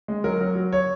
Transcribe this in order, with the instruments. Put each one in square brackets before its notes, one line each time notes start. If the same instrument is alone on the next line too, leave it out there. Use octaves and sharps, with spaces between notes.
[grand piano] G#3
F#3 A#4
F#3
F#3
C#5